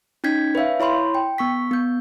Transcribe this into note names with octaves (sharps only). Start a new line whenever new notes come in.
C#4 D#4 G6 G#6 B6
B4 C#5 E5 F5
E4 C#5 B5 C6
G5
B3 C#6 B6
B3 G6